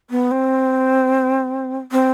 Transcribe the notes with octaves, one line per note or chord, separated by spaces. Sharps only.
B3
C4
C4